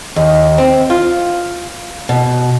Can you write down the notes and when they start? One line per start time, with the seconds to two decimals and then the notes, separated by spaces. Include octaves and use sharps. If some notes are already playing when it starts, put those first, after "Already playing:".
0.16 D#2
0.58 C4
0.90 F4
2.09 B2